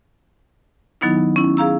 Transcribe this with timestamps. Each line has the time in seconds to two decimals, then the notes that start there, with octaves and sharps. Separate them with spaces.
1.01 D#3 F#3 B3 D#4 E4
1.36 C#4 E4
1.57 G#4 F5 A#5 E6